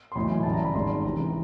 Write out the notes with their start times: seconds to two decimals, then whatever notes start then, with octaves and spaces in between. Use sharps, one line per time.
0.12 C6
0.15 B1 A2 E3 B5
0.31 G#5
0.43 A1 G2 D3 A5
0.53 A#5
0.64 B5
0.74 G#1 G#2 D#3 C6
1.04 C#2 C3 E3 A#5